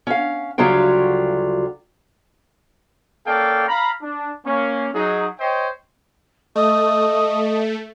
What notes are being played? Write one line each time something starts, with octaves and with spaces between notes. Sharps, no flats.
C#4 F5
D2 C#3 F#3 G3 F4 G5
A#3 C#4 A4 D5 F5 G5
F5 A#5 B5
D4
A#3 C#4
F#3 D#4 G#4
C5 C#5 D#5 G5
A3 D#5